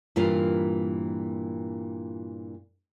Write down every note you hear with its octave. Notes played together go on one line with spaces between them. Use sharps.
G2 A#2 E3 F4 A#4